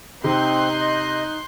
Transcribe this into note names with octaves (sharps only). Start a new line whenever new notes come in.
C3 C4 D#4 C6 F#6 G6
D#5